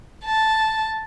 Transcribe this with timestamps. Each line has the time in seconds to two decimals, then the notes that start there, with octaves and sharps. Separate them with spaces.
0.25 A5